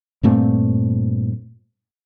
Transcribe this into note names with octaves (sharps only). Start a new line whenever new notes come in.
G2 A#2 A3 C4